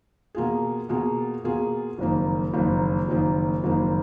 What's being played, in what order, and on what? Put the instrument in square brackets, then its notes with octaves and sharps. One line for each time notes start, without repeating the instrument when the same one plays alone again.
[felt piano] B2 A#3 F4 G#4
B2 A#3 F4 G#4
B2 A#3 F4 G#4
F#1 F2 D#3 A#3
F#1 F2 D#3 A#3
F#1 F2 D#3 A#3
F#1 F2 D#3 A#3